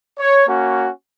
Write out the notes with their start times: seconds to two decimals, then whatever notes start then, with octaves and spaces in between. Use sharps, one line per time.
0.19 C#5
0.47 A#3 C#4 F#4